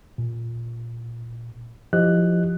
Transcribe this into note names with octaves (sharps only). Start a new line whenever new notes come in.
A#2
F3 E4 G4 D#5 F#6